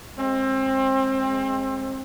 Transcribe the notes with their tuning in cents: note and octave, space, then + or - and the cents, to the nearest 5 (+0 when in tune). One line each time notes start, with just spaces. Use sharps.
G#3 +0 C4 +30